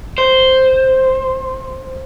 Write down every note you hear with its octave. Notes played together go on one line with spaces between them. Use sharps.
C5